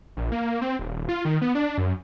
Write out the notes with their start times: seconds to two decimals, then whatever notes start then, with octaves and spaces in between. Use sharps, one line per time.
0.17 A#1
0.32 A#3
0.61 C4
0.79 D#1
1.09 F4
1.25 D#3
1.42 B3
1.55 D4
1.78 F#2